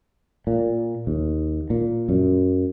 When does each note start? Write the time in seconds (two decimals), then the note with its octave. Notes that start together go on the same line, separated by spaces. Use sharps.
0.47 A#2
1.07 D#2
1.70 A#2
2.09 F#2